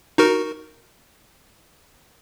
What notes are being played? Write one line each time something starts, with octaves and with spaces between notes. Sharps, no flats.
D#4 F#4 A#4